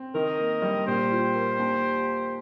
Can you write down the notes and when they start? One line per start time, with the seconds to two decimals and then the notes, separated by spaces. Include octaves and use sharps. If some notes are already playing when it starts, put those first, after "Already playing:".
Already playing: C4
0.14 D#3 A#4 D#5
0.38 A#3
0.62 G3
0.86 A#2 G4 C5
1.11 F4
1.35 A#3
1.59 D#2